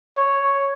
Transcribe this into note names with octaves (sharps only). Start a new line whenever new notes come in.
C#5